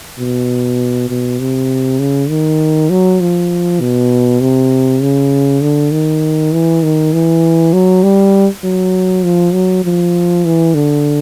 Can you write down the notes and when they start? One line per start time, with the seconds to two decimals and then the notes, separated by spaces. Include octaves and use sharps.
0.19 B2
1.09 B2
1.40 C3
2.00 C#3
2.29 D#3
2.90 F#3
3.20 F3
3.81 B2
4.41 C3
5.02 C#3
5.61 D3
5.91 D#3
6.52 E3
6.83 D#3
7.13 E3
7.73 F#3
8.03 G3
8.64 F#3
9.24 F3
9.54 F#3
9.85 F3
10.45 E3
10.74 D3